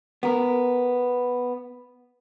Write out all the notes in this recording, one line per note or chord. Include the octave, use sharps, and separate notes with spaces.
B3 A#4